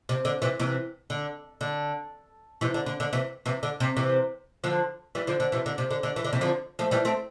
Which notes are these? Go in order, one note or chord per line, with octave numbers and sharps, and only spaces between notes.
C3
D3
C3 E3
C3 E3
D3
D3
C3 E3
D3
D3
D3
C3 E3
C3 E3
D3
C3
C3 E3
D3 F3
E3 G3
D3 F3
D3
C3 E3
D3
C3
D3
D3
E3
D3
C3 E3
D3 F3
F3 A3
E3 G3
A3 C4